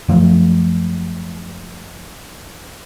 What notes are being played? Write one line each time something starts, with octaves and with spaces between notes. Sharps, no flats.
F#2 F3 A3